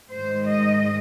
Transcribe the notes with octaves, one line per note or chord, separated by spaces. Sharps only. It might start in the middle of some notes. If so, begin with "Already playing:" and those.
G#2 D#3 G#3 C5
D#5